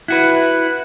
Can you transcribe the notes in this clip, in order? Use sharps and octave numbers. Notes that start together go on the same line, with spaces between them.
E4 F#4 B4 F#6